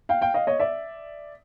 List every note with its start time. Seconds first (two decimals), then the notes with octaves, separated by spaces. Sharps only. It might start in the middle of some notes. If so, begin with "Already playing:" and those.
0.09 F5 G5
0.21 F5 G5
0.34 D#5 F5
0.47 C#5 D#5
0.59 D5 E5